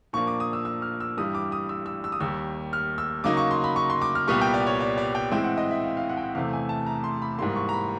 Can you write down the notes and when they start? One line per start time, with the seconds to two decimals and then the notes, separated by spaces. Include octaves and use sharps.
0.13 A#2 F3 A#3 D4 C#6
0.27 D6
0.40 D#6
0.53 E6
0.65 E6
0.82 F6
1.00 E6
1.17 G2 E3 G3 D#6
1.34 D6
1.52 D#6
1.69 E6
1.86 E6
2.04 E6
2.12 D#6
2.20 D#2 D#3 G3 E6
2.73 F6
2.98 E6
3.24 C#3 F#3 A#3 D#4 D6
3.37 C#6
3.51 C6
3.64 B5
3.76 C#6
3.90 C6
4.02 D6
4.15 F6
4.28 C2 A#2 G3 B3 C#6
4.41 G5
4.54 D5
4.67 C#5
4.80 D5
4.98 D5
5.15 G5
5.32 A2 E3 G#3 C4 E4 G5
5.44 F#5
5.58 D#5
5.71 E5
5.84 F5
5.97 F5
6.09 F#5
6.17 G5
6.22 F#5
6.35 E2 C3 E3 A3 F5
6.53 G#5
6.69 A5
6.86 A#5
7.04 C6
7.22 B5
7.38 G#2 E3 G3 A#3 C6
7.56 C#6
7.69 A#5
7.73 B5